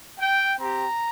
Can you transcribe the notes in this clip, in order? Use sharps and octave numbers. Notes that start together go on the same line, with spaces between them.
G5
C4 G4 A#5